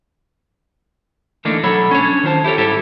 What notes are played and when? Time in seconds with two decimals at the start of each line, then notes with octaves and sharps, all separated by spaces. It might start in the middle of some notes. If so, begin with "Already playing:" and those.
1.45 D2 E3 A3 A#3 D4 D#4
1.64 B1 F#3 A4 C#5 B5
1.91 C#4 D4 C#5
2.23 D#3 F4 C5 A5
2.44 E4 G4 A4 C#5
2.57 G#2 G3 E4 G4 A4